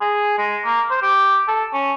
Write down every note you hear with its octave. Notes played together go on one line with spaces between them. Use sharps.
G#4
G#3
A#3
C5
G4
A4
C#4